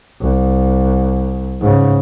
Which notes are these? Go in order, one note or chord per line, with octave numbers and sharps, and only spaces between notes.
C2
G#2 C#3